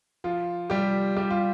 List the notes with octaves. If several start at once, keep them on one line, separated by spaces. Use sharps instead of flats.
F3 F4
G3 G4
G3 G4
F4